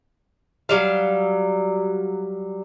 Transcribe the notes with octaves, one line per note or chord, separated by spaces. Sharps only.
F#3 G3 F5